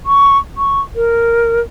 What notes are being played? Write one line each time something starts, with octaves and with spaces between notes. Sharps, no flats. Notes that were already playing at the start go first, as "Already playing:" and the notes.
C#6
C#6
A#4